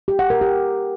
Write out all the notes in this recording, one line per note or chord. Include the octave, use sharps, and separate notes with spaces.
G4
F#5
A#4
G4